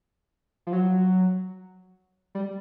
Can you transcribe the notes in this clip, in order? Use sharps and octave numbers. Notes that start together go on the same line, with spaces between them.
F3
F#3
G3